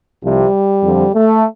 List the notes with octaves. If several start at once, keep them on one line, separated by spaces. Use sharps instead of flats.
C2 C3 F3 G3
F2 D3 F3
A3